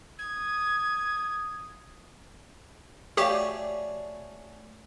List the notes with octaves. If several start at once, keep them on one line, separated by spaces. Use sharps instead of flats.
D#6 G#6
F#3 A3 G4 G#4 C#5 D5 F5 C#6